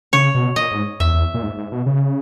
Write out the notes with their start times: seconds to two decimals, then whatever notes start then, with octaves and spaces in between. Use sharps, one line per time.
0.13 C#3 C#5
0.35 B2
0.56 A#2 D#5
0.71 G#2
1.00 E2 E5
1.14 E2
1.34 A#2
1.43 G#2
1.58 G#2
1.72 B2
1.86 C#3